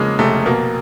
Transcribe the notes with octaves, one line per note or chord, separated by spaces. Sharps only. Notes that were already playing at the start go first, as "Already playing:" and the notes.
Already playing: E2 C#3 F3 G#3 A#3
F1 A3
B2 A#3